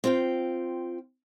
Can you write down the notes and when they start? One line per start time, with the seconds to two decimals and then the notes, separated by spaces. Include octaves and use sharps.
0.04 C4 F4 G5